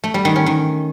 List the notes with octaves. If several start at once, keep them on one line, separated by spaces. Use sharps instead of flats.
A3
G3
D#3
C#4
D#3